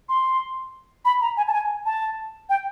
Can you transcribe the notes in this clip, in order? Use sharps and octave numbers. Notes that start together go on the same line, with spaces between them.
C6
B5
A#5
G#5
A5
G#5
A5
G5